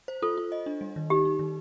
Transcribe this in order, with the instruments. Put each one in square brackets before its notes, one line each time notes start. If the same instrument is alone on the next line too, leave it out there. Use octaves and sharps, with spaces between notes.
[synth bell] C5
[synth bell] F4 [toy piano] A4
[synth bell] F4
D#5
D4
G3
D#3
[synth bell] D#4 [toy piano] G4
[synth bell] D#4
D#3